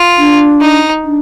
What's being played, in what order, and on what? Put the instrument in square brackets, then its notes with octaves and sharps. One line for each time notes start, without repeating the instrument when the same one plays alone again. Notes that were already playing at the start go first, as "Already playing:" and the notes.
Already playing: [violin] F4
[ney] D4
[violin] D#4
[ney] D4